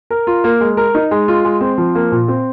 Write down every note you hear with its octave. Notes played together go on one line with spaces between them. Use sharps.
A#4
F4
A#3
G#3
A#4
D#4
G#3
F4
G#3
C4
F3
A#3
A#2
C4